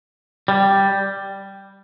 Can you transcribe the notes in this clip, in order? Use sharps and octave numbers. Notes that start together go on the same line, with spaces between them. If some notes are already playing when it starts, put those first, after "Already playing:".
G3